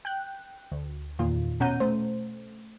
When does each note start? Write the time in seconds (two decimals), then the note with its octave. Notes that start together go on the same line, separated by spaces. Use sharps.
0.05 G5 F#6 G6
0.72 D2
1.19 E2 A#2 D#3 F4
1.60 B2 C#4 F#5 A#5 G6 D#7
1.80 A3 C5